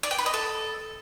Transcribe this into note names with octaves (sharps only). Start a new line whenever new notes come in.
D5
G5
B4
D#5
A4